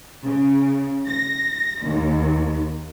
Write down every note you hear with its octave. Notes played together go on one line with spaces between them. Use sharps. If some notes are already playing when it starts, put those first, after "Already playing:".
C#3
A#6
D#2